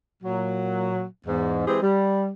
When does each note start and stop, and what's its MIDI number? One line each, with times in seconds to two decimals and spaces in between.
0.23 1.04 46
0.23 1.04 54
1.27 1.64 40
1.27 1.64 44
1.67 1.79 52
1.67 1.79 56
1.67 1.79 60
1.67 1.79 67
1.67 1.79 68
1.82 2.30 55